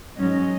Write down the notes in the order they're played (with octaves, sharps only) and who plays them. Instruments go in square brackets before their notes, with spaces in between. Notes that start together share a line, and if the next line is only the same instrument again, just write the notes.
[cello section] G#2 F#3 C#4 D#5